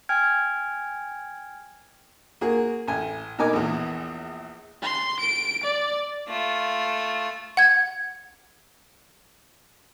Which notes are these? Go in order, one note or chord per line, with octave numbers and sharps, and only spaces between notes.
G5 G#5 F6 G#6
A#3 F#4 G#4
A1 G#5
B2 D#4 A#4 G#5 D6
A#1 E2
C6
D7
D5
A3 F4
F#5 G#6